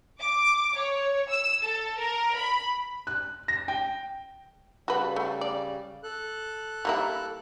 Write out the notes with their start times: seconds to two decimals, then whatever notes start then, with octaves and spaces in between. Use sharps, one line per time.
0.19 D6
0.77 C#5
1.29 E6
1.62 A4
1.99 A#4
2.36 B5
3.07 F#6
3.48 A#6
3.68 G5
4.88 C#3 G3 F#4 B4
5.16 A3
5.41 D5
6.04 A4 F#6
6.85 G3 A#3 E4